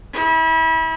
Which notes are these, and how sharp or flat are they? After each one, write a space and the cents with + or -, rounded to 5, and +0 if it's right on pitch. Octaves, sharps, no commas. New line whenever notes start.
E4 -35